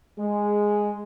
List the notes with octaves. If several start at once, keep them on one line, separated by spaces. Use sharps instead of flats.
G#3